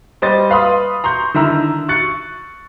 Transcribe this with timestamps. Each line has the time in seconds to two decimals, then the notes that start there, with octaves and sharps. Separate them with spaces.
0.22 G3 C5 D#5 A6
0.50 B4 F5 B5 C6 D#6
1.04 A#5 C6 C#6 G6
1.34 D3 D#3 E4 A#5 E6
1.89 C#6 F#6 A6 C#7